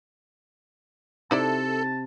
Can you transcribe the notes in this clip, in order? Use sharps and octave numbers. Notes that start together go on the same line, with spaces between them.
C3 D#4 E4 A4 D5 A5